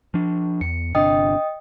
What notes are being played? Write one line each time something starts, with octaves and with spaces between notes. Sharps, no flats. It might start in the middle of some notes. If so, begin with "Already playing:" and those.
F3 D4
E2 C#7
G1 C3 D4 D#5 G5 D#6